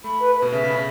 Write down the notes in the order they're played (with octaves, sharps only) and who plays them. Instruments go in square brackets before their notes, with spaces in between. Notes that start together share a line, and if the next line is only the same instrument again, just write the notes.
[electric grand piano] A3 [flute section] B5
[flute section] B4
B4
[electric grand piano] B2
[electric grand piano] C#3 [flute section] E5
[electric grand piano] C#3
[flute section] B5
[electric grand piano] C#3